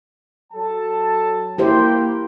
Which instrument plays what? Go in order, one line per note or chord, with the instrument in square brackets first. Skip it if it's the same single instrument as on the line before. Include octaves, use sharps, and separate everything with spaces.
[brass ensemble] F#3 A4 A5
[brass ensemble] A#3 G5 [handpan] E4 G4 C5